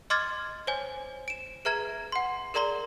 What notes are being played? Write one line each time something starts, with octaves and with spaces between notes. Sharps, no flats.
D#5 C6 D6 F6 G#6 A6
C5 C#5 G#5
D7 E7
G#4 B4 E5 A#5 G#6
F#5 C6
G#4 A#4 D5 A#5 C6 G7